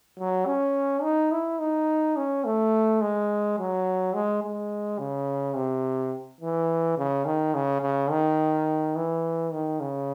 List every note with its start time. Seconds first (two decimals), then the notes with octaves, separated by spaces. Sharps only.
0.18 F#3
0.47 C#4
1.03 D#4
1.32 E4
1.59 D#4
2.16 C#4
2.45 A3
3.01 G#3
3.58 F#3
4.14 G#3
4.43 G#3
4.99 C#3
5.56 C3
6.41 E3
6.98 C#3
7.26 D#3
7.54 C#3
7.82 C#3
8.11 D#3
8.96 E3
9.52 D#3
9.80 C#3